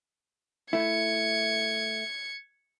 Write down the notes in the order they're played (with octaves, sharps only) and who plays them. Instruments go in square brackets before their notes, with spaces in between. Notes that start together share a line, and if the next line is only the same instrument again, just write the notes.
[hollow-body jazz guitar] A3 E4 [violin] G#6 C#7